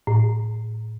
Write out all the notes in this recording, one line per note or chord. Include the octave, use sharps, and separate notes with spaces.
A2